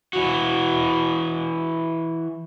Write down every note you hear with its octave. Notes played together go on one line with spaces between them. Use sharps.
E3 F#4